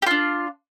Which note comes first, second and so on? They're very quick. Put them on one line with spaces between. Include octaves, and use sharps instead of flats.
G4 F4 D4